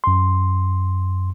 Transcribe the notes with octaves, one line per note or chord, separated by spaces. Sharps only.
F#2 C6